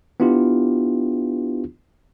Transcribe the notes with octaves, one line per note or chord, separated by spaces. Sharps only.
B3 D4 E4 F4 G4